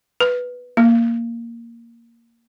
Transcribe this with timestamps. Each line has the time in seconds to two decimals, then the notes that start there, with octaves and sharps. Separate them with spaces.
0.20 B4
0.77 A#3